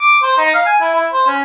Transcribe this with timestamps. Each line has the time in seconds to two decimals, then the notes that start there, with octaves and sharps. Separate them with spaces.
0.01 D6
0.23 C5
0.38 D#4
0.55 F5
0.66 G#5
0.81 E4
0.95 E4
1.13 C5
1.28 C#4